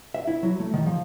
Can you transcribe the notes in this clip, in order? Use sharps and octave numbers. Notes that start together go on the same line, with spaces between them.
E5
E4
F#3
A3
D#3
F3